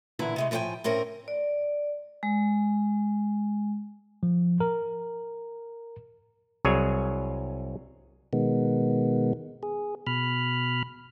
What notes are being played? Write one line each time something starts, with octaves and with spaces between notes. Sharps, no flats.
A#2 D3 E3 E4
C3 G#3 A3
A2 F3 D#4 E4 G5 G#5
A2 C4 C#4 A#4
D5
G#3
F3
A#4
C2 F#3 G#4 C#5 G#5
B2 D#3 G#3 B3
G#4
B2 B5 F6